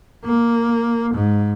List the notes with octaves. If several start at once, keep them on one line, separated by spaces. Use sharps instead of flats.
A#3
G#2